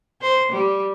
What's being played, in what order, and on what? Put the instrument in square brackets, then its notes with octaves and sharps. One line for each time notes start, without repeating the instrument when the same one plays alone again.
[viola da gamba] C5
G3